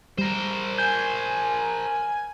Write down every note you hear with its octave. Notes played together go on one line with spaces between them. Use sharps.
G3 A#4 C5
G#5 G6